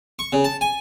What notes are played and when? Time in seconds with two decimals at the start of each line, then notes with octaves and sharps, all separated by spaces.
0.19 C#6
0.33 C#3
0.44 A5
0.61 G#5